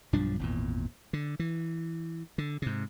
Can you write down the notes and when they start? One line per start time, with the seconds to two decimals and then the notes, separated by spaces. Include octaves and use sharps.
0.13 B1 G2 F3 D4
0.39 G#1 E2 A#2
1.13 D3
1.39 E3
2.38 D3
2.62 G#2 C3